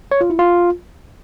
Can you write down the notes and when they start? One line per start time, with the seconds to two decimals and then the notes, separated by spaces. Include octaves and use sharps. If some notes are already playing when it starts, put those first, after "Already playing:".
0.12 C#5
0.21 F4
0.30 E4
0.39 F4